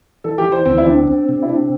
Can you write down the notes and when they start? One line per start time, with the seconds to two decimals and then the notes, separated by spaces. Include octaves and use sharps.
0.24 E3 A4
0.38 G4
0.45 E3
0.52 C5
0.65 D2 C4
0.78 E4
0.86 C4 D4
1.08 C4
1.29 C3
1.42 E4
1.49 C4 D4